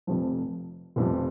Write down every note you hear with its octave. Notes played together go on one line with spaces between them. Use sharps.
F1 F2 C3 F3
F1 F2 C3 F3